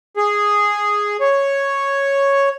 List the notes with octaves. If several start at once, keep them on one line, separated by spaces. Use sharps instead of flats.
G#4
C#5